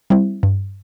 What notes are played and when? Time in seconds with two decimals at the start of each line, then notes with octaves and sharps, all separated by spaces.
0.10 G3 C4 E4
0.43 G2